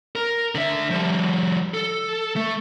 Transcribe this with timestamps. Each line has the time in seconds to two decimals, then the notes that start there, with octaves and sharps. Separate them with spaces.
0.15 A#4
0.55 D3 E5
0.91 F3 G3
1.74 A4
2.36 A3